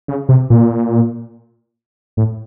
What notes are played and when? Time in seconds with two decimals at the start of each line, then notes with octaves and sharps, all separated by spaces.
0.08 C#3
0.29 C3
0.50 A#2
2.17 A2